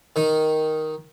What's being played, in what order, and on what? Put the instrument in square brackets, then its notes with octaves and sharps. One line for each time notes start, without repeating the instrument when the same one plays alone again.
[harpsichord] D#3 D#4